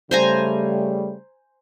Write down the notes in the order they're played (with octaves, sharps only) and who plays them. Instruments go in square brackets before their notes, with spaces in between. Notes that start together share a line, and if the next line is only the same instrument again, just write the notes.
[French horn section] C#3 G3 A3 [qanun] C5 G#5 A#5